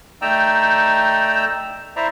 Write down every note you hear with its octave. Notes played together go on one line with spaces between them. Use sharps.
A3 D#4 D5 G5 A#5 E6
E4 C5 D5 E5 A#5